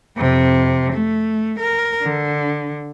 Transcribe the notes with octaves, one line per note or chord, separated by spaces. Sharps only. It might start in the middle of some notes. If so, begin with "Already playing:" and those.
F2 C3
A3
A#4
D3